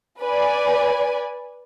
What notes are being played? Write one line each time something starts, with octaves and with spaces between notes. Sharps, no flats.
B4 D5 G#5